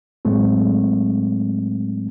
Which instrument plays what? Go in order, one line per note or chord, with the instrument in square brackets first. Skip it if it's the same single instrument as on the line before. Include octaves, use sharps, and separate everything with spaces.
[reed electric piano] A2 F#3 G#3 A3 C4